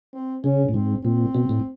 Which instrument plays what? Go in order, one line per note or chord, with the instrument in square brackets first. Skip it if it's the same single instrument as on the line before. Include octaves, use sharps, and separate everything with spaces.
[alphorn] C4
[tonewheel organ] C#3 [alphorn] C#4
[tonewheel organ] A2
[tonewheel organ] G#2 [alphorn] C4
[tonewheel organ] A#2 [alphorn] C4
[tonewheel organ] B2
A2